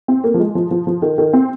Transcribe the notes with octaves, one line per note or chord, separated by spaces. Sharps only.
C4
A#3
F3
G#3
F3
F3
F3
D#3
D#3
C4